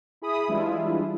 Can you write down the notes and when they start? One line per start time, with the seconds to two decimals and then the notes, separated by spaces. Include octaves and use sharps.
0.22 E4 G#4 B5 D#6
0.48 E3 G3 G#3 D4 E4 F4